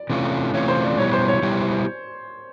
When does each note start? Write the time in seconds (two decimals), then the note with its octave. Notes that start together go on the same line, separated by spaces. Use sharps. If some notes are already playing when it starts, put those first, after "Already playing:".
Already playing: D5
0.10 C3 E3 A3 C#4 F4
0.54 C3 E3 A3 C#4 F4 C#5
0.68 C5
0.83 D5
0.98 B2 G3 B3 E4 G4 C#5
1.13 C5
1.28 C#5
1.42 B2 G3 B3 E4 G4